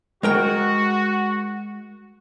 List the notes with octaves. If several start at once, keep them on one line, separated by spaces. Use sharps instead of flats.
G#3 F#4 A#4 G5